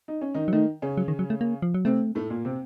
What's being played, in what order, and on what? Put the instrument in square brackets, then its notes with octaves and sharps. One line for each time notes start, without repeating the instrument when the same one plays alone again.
[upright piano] D#4
C#4
D#3 D#4
[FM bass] F#3
[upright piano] D#3 D#4 [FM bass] A3
[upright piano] C#3 C#4
[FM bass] F#3
D#3
F#3
A3
A#3
F3
F#3
[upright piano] C3 C4 [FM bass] A3
[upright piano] A2 A3
A#2 A#3
C3 C4